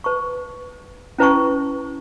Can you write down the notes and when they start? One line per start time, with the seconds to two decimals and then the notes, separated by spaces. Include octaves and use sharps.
0.04 B4 A5 C#6
1.18 C#4 E4 B4 A5 C#6